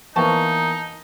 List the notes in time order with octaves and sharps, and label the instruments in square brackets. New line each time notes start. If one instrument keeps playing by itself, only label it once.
[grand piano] E3 A#3 B3 [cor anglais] D#4 [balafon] C5 G5 C#6 [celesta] A5